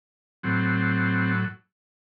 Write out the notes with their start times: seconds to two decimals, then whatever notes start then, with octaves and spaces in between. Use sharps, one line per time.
0.43 A2 F#3 C4